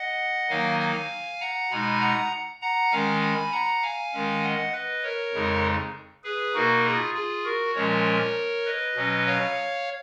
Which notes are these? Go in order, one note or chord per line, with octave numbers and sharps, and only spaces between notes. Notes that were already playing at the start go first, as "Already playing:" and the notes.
Already playing: D#5 F#5
D#3 F#3 A#3 D#4 F5 G#5
F5 G#5
F#5 A#5
B2 G#3 D#4 G#5 B5
F#5 A#5
F#5 A#5
D#3 G#3 C#4 F5 G#5
G#5 B5
F#5 A#5
F5 G#5
D#3 G#3 C#4
D#5 F#5
B4 D#5
A#4 C#5
F2 C#3 G#3 D#4
G#4 B4
B2 A#3 D#4 F#4 A#4
F4 G#4
F4 G#4
F#4 A#4
A#2 F3 G#3 C#4 A#4 C#5
B4 D#5
B2 F#3 C#4
C#5 F5